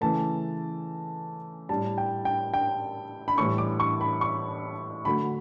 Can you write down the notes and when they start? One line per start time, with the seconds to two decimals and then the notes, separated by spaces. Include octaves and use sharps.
0.01 C#3 E3 A3 A5
1.69 A2 G3 A5
1.98 G5
2.25 G5
2.54 G5
3.28 B5
3.38 A2 E3 G3 C#6
3.58 D6
3.80 C#6
4.01 B5
4.21 C#6
5.05 D3 F#3 A3 B5